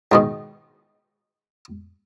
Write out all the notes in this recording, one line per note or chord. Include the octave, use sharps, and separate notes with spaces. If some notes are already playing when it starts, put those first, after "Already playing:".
G#2 B2 D#3